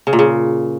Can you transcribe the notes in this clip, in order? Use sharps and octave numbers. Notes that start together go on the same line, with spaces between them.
C#3
A#2
C#3